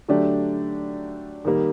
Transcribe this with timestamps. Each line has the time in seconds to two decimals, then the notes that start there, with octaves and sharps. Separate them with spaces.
0.08 D3 F#3 A3 D4 G4
1.45 D#3 G3 A#3